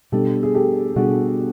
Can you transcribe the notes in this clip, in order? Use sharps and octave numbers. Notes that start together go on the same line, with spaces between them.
B2 G3 B3 D4 G4 A4
G#4
G4 A4
B2 G3 B3 D4 F#4 G#4